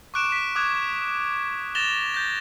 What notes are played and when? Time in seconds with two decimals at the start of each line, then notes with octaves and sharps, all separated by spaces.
0.14 C#6 D6 F#6 D7 E7
0.32 B6
0.56 D6 D#6 F#6 G#6
1.75 A6 A#6 E7 F7 G7
2.14 G6 A6 A#6